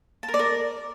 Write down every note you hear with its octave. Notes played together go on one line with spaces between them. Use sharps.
A5
A#4
D5
A#4